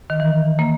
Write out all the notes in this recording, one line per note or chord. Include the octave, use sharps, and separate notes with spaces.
D#3
E3
A#3